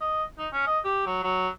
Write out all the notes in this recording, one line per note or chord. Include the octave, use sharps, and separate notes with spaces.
D#5
D#4
C#4
D#5
G4
F#3
F#3